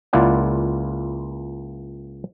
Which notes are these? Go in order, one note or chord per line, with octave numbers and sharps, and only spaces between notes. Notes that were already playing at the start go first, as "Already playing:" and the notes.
C#2 A#3 E4 F4 D5 F#5